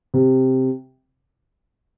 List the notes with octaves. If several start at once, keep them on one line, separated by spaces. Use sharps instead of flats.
C3